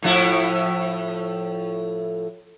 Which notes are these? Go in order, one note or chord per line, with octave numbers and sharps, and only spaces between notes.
A2 F3 E4